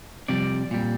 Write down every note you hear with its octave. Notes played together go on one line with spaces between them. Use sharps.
F2 C3 G3 D5
A#2 G3